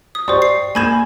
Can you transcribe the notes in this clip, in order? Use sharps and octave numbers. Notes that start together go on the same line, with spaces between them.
D#6
G4 C5 D5 C6 C#6
C7
A#3 G#5 B5 G6 G#6 E7